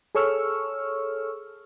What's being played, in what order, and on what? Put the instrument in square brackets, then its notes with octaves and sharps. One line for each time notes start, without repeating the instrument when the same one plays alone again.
[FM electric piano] G#4 A4 C#5 C#6 E6 F6